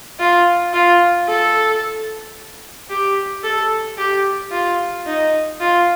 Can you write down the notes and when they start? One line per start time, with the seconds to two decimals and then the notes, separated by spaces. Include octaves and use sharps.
0.20 F4
0.74 F4
1.29 A4
2.90 G4
3.43 A4
3.98 G4
4.51 F4
5.06 D#4
5.60 F4